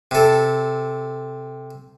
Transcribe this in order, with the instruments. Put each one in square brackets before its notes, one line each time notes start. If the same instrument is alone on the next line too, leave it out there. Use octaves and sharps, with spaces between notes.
[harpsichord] C3 A4